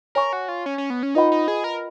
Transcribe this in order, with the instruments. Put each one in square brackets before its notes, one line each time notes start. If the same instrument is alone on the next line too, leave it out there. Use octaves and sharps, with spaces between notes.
[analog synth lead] A#4 [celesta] C#5 G#5 C#6
[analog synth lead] F#4
F4
C#4
C#4
B3
C#4
[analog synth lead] D#4 [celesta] F4 B4 D#5 F#5 B5
[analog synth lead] D#4
G#4
A#4